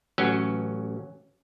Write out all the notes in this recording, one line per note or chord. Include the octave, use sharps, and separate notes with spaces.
A1 F#3 C#4